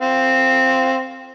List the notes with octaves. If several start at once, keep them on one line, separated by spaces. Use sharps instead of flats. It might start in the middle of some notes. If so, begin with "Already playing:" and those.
C4 F5